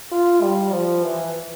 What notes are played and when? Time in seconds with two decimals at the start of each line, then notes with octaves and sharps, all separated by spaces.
0.12 F4
0.42 G3
0.72 F3
1.03 E3